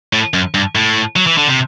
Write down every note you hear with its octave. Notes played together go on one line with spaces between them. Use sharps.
A2
F#2
G2
A2
F#3
E3
D3
C3